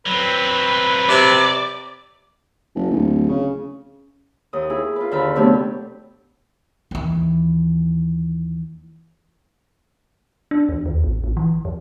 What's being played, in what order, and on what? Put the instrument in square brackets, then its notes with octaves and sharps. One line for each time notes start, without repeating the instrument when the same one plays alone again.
[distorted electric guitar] F#3 C4 [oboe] B4
[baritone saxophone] C3 [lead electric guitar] D5
[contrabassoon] F#1
D1
C#3
[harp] D#2 D#6
E4 G#4
F4 B4
D#2 D3 E5 F5 B5
C3 F#3 A3 B3 D4 G4
[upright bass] D#2 E3
[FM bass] D4
E2
D#2
A1
A1
E3
F2